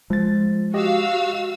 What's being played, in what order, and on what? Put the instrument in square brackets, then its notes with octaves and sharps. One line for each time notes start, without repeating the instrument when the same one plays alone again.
[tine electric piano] F3 A6 [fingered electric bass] G#3
[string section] F#4 F5 E6 [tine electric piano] G4 D#5